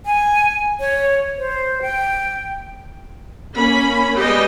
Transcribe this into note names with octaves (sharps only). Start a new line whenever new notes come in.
G#5
C#5
C5
G5
A#3 C#4 B5
G3 G#3 B3 D#5 G5